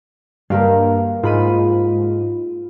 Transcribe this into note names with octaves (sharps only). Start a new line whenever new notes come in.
G2 A#3 G4 F5
G#2 F4 B5 D#7